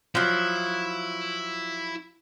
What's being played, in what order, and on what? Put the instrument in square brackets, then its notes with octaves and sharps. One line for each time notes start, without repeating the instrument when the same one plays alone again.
[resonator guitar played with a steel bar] F3 F#3 [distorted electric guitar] E4